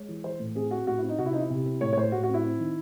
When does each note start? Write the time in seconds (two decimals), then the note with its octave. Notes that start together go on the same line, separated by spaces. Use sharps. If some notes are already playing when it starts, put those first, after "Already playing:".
Already playing: G#3 C#5
0.09 E3
0.24 E3 C5
0.39 A2
0.55 C4 G#4
0.71 C4 F#4
0.87 A2 F#4
0.98 C4 E4
1.09 D#4
1.18 C3 F#4
1.26 E4
1.33 C4 D#4
1.41 E4
1.50 C3
1.66 C4
1.81 A2 C#5
1.93 C#5
1.97 A2 C5
2.12 A2 F#4
2.23 F#4
2.29 C4
2.34 E4
2.45 C4
2.60 D#3